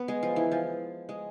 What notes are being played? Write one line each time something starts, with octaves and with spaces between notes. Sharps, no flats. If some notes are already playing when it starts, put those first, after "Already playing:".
Already playing: B3
G#3
F3
E3
F3
G#3